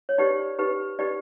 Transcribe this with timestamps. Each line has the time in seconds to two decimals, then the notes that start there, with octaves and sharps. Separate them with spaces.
0.09 C#5
0.18 D#4 G4 B4 D5
0.58 D#4 G4 B4
0.99 D#4 G4 B4 D5